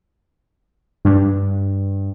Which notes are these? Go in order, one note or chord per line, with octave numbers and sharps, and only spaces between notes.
G2